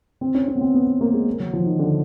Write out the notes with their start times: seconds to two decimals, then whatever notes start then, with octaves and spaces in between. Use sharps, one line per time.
0.21 C4
0.34 C#4
0.48 C#4
0.55 B3
0.61 C4
0.74 B3
0.87 B3
1.01 A#3
1.14 G#3
1.40 F#3
1.53 F3
1.66 D#3
1.79 D3